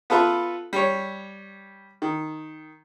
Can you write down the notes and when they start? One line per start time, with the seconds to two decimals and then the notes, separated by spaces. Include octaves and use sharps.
0.10 B3 F4 A4 B4 E5
0.73 G3 C#5
2.02 D#3